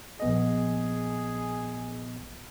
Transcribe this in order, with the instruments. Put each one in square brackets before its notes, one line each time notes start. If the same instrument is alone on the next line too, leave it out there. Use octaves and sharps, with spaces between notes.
[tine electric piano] A#1 B3 D#5 [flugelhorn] G#4